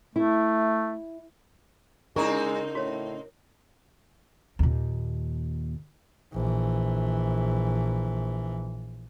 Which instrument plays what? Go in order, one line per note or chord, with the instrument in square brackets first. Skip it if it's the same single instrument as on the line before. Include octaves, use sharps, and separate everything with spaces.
[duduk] A3 [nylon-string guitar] E4
[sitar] C#3 C4 D#4 [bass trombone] G#3 [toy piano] E4 A#5 C#6 [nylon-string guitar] A#4
[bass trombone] A2 [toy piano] F#4 C#5
[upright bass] D#2 A#2
[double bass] A#1 E3